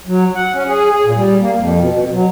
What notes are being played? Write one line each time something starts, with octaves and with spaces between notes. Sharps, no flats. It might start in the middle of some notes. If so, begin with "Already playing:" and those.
F#3
F#5
C#4
G#4
G#4
A#2
G3
A#3
F2
B2
B2
F#3